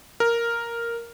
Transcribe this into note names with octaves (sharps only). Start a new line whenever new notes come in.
A#4